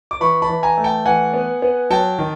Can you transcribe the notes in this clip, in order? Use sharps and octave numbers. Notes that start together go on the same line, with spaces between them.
D6
E3 B5 C#6
A5 B5
E3
G#5 A#5
A3
G5 A5
E3 F#5 G#5
B3
B3
F#3 G5 A5
D#3